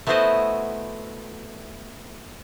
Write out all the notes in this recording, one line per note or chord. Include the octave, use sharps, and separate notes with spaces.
A3 B3 E4 F#4 C5 D#5